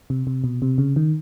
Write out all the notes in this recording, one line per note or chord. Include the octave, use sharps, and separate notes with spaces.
C3
C3
B2
C3
C#3
D#3